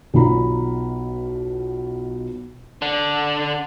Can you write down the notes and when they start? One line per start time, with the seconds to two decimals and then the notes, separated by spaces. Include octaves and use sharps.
0.14 B1 B2 F4 A#5 B5
2.82 D3 D4